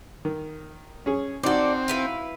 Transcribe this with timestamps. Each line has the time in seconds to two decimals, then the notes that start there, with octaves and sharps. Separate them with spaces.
0.25 D#3
1.06 C#4 G#4
1.43 C4 D#4 F#4 A4 D5
1.88 E4 B4 F5